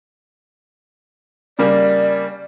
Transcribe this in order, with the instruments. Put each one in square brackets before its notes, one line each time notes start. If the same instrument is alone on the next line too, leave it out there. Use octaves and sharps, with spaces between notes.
[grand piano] C#3 G3 A#3 [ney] D5